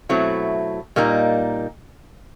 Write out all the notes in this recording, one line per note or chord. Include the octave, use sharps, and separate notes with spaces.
B2 F#3 A3 C4 E4
A#2 G3 A#3 D#4